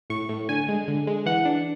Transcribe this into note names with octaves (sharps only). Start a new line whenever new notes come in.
A2 C#6
A2
D3 G#5
G#3
D3
G#3
E3 F#5
D4